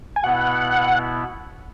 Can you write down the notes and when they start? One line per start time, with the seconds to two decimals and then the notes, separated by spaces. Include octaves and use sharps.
0.16 G#5
0.23 B2 B3 E4 F#5